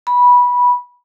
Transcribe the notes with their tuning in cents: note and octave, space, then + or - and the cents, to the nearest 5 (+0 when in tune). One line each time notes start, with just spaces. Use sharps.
B5 -15